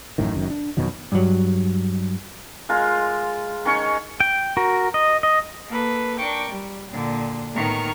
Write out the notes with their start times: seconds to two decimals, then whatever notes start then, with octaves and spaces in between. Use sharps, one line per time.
0.18 A1 F#2 A2 D#3
0.35 F#1 F#2 D#3
0.50 D4
0.77 F2 B2 D#3 F#3
1.12 G2 F#3
2.69 G#3 F4 A#4
3.65 D#3 C#4 C#6
4.20 G5
4.57 F#4 A#4
4.94 D#5
5.23 D#5
5.67 A#3 A4 B4
6.17 D4 A#4 G5 C#6 D6
6.49 G3
6.90 A#2 D3
7.53 A2 D#3 B3 A#5 C#6 F6